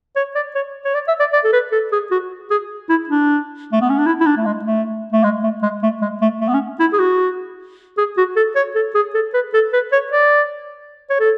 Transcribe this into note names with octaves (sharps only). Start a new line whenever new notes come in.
C#5
D5
C#5
C#5
D5
E5
D5
D5
A4
B4
A4
G#4
F#4
G#4
E4
D4
A3
B3
C#4
D4
E4
E4
D4
A3
G#3
A3
A3
G#3
A3
G#3
A3
G#3
A3
A3
B3
C#4
E4
G#4
F#4
G#4
F#4
A4
C#5
A4
G#4
A4
B4
A4
B4
C#5
D5
C#5
A4